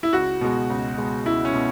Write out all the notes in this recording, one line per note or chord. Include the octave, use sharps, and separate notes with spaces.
E4
C#2 F#4
B2 G#3
C#2
B2 G#3
C#2 E4
C#4
B2